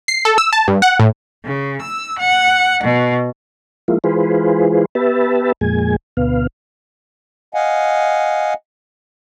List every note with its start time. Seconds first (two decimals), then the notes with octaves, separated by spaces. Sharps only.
0.08 C7
0.25 A4
0.38 E6
0.53 A5
0.68 G2
0.82 F#5
1.00 A2
1.44 C#3
1.82 E6
2.19 F#5
2.83 B2
3.88 F3 G#3 A#3 E4 F4
4.04 E3 G#3 F4 G#4 B4 C5
4.95 B3 G4 B4 E5 A5
5.61 F2 A#2 G#3 G#5
6.17 D2 B2 B3 F5
7.54 D#5 F5 F#5 G#5